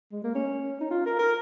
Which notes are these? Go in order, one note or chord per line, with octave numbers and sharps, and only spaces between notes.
G#3
A#3
C#4
D#4
F4
A#4
A#4